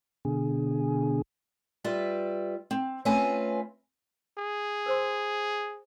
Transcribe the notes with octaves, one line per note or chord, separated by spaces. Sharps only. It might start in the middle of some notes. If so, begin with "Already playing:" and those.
B2 D3 G#4
G3 F4 B4 E5
C4
A3 C4 C#4 F4 B4 G#5
G#4
A#4 C5 C6